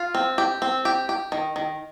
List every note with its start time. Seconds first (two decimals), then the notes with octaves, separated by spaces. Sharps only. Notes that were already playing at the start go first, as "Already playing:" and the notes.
Already playing: F4
0.15 C4
0.38 G4
0.62 C4
0.85 G4
1.09 G4
1.32 D#3
1.56 D#3